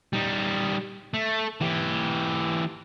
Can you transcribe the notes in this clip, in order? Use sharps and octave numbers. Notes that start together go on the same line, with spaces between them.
G3 D#4
A3
E3 G4